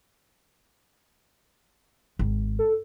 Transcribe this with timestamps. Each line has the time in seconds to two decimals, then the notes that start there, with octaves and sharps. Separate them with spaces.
2.19 G#1
2.59 A4